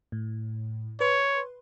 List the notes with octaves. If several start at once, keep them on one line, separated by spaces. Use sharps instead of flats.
A2
B4 C#5 C6